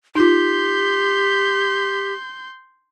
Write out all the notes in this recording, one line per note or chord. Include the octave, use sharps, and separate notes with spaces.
D#4 F4 G4 C6 G6